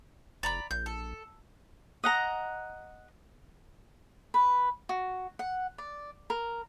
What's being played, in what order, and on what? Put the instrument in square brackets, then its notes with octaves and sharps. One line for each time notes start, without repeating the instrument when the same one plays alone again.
[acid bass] F1 [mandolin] D5 A#5 B5
[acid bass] A#1 [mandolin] G6
[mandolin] A4
[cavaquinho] D#5 F#5 A#5
B4
F#4
F#5
D5
A#4